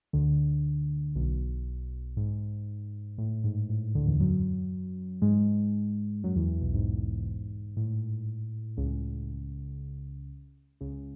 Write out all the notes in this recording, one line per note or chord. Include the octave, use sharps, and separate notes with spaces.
D2 D3
B1 B2
G#2
A2
G#2
A2
D2 D3
E2 E3
F#2 F#3
G#2 G#3
F#2 F#3
E2 E3
B1 B2
G#2
A2
C#2 C#3
C#2 C#3